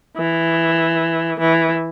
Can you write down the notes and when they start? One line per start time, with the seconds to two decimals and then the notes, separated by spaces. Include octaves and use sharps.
0.17 E3
1.40 E3